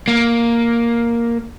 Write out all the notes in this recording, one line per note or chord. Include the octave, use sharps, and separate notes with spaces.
A#3